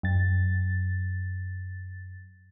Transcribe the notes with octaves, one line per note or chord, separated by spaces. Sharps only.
F#2 A6